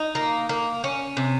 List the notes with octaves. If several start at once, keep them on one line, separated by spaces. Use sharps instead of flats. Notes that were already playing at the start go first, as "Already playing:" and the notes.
Already playing: D#4
A#3
A#3
C#4
C3